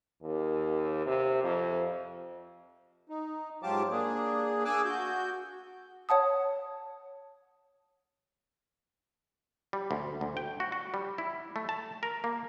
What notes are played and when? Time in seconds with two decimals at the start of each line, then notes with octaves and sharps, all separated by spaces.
0.22 D#2
1.06 C3
1.43 F2
3.09 D#4
3.63 G#2 F#3 F4 G4 A5 D6
3.91 A#3 D4 G#4
4.65 G#4 G#5 D6 E6 F#6
4.85 F#4 G6
6.09 C#5 F#5 A5 D#6
9.73 G3
9.91 D2
10.21 D2
10.37 G5
10.60 F#4
10.72 F#4
10.94 G3
11.18 E4
11.56 A3
11.69 A5
12.03 A#4
12.24 A#3